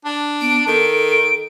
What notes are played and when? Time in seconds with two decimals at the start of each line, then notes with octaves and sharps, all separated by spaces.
0.05 D4
0.41 B3 D7
0.67 D#3 A4